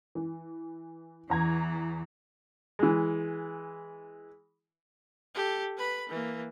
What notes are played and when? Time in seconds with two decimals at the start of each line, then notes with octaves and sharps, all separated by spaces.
0.15 E3
1.30 E2 E3 A#5 G#6
2.79 E3 G#3
5.34 G4 A4
5.77 B4 B5
6.09 E3 A#3